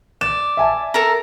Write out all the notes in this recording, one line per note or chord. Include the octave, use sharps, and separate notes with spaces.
D5 E7
E5 G#5 A5
A4 A#4 A#5